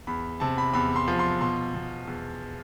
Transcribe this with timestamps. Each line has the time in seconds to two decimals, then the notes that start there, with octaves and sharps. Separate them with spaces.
0.07 E2 B5
0.40 C3 A5
0.58 B5
0.74 E2 B5
0.96 C6
1.08 F3
1.19 C6
1.41 B2 C6
1.74 B2
2.07 E2